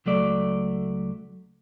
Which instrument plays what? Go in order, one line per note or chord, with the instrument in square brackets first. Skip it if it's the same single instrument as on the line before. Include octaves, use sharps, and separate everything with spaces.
[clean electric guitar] C#2 F#3 A3 D5